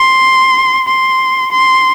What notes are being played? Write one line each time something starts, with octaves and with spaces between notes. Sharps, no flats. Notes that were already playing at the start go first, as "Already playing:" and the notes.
Already playing: C6
C6
C6